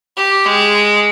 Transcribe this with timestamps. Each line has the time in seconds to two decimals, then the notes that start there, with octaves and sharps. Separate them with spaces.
0.17 G4
0.46 G#3